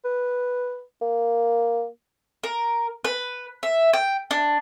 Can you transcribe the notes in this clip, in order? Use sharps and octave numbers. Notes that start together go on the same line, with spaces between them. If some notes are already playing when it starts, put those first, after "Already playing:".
B4
A#3
A#4
B4
E5
G5
D4